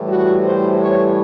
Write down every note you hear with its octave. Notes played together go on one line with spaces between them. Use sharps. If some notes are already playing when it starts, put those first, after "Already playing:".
Already playing: A2 E3 G3
F#4
C5
C#5